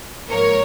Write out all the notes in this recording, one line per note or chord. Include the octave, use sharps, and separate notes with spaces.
G#2 F3 A#3 A#4 C#5